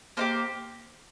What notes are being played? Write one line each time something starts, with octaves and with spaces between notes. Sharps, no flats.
A#3 D#4 G4 C5